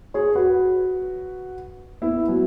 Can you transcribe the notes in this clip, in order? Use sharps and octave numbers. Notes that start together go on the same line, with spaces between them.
G#4 C#5
F#4 B4
B3 E4
F#3 B3